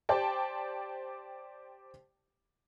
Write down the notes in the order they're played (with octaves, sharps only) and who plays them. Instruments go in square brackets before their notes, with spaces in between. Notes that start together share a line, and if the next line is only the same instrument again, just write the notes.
[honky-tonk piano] G4 C5 D5 G5 A5